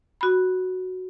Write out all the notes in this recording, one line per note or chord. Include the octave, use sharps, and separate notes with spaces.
F#4 B5